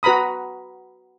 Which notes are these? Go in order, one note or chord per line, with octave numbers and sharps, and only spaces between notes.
F#4 B4 A#5 B5 D#6